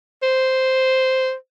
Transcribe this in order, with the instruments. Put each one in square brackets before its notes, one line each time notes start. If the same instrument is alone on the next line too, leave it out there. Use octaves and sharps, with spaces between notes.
[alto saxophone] C5